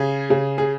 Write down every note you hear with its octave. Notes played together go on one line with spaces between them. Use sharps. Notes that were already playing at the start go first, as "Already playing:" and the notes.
Already playing: C#3 G#4
C#3
G#4